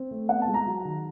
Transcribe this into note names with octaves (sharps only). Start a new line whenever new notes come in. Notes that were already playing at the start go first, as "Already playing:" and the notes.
Already playing: C4
A3
B3 F#5
A5
G#3
A#5
F#3
D#3